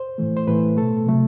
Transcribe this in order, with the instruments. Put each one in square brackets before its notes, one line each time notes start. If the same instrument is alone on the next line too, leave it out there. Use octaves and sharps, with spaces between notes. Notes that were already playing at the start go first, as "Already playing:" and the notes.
Already playing: [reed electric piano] C5
A2 E3 A3
C5
A2 E3 A3 B4
B2 A3 A4
C3 F#3 A3